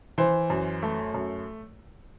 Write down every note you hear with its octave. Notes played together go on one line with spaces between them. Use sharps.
E3 C5
F#2
A3
F#2